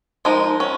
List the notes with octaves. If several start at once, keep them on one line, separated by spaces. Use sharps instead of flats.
F3 G#3 D#4 A#4
C#4